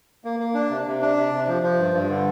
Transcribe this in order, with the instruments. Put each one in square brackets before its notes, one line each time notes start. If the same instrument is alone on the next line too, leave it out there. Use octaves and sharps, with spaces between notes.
[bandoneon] A#3
A#3
D4
C3
C3
D4
C3
C3
F3
F3
G2
G2
D3